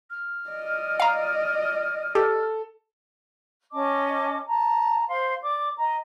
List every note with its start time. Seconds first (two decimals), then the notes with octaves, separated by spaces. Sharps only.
0.10 F6
0.50 D5 D#5
1.00 F5 A#5
2.15 G4 A4
3.72 C#4 D#5 A5 D6
4.47 A5 A#5
5.08 C5 F5 C6
5.43 D5 D6
5.78 D#5 A#5